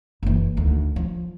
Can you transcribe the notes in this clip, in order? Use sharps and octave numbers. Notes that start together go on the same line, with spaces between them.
F#1 E3
D2 D#3
F3